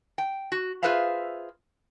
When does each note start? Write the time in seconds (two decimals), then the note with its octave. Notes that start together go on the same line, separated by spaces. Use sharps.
0.18 G5
0.52 F#4
0.83 F4 G#4 B4 C5 E5 F5